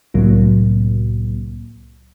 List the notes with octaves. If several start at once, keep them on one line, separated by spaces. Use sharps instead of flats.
C2 A2 C3 F#3 A#3